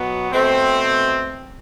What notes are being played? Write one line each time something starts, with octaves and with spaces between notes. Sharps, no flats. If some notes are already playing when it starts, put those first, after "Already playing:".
Already playing: B2 F#3 B3
B2 A3 C4